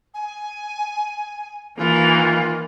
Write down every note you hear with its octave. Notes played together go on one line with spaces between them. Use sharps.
G#5
D#3 E3 A#3 F4